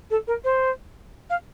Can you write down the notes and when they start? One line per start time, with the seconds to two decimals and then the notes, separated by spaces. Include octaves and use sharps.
0.10 A4
0.27 A#4
0.44 C5
1.30 F5